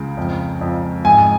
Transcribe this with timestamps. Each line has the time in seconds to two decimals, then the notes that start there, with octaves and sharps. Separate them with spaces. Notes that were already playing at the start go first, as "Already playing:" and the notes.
Already playing: C#2 C#3
0.17 F2
0.61 F2
1.05 G#2 G#5